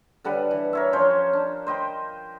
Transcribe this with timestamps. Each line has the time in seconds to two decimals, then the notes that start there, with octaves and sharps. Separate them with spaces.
0.24 D3 G3 B4 F#5
0.51 E3
0.73 A#4 C#5 E5
0.93 F3 C#4 C5 C#5
1.33 D4
1.67 C5 D#5 G5 B5